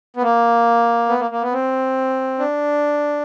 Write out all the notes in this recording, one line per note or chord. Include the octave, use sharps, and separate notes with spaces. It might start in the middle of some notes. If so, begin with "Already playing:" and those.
B3
A#3
B3
A#3
A#3
B3
C4
D4